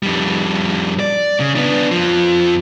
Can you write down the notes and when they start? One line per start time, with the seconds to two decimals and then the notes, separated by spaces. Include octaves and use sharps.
0.03 F2 G3
1.00 D5
1.40 C#3
1.56 B3 D4
1.92 F2 F3